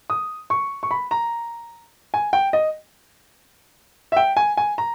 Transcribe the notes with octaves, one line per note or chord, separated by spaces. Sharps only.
D#6
C#6
C#6
B5
A#5
G#5
G5
D#5
E5
G5
G#5
G#5
A#5